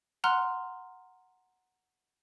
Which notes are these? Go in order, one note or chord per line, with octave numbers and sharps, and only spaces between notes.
F#5 A#5 C6 F6 F#6